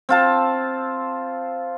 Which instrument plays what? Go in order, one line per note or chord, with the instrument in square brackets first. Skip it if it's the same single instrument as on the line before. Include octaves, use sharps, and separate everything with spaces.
[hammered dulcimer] C4 F4 A5